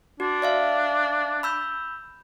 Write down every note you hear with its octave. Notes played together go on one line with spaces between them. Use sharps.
D4 F#4
D5 E5 F5
B5 E6 G6